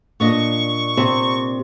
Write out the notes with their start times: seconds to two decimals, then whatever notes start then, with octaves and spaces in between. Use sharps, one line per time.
0.20 A#2 D4 D#5 C#6
0.97 C3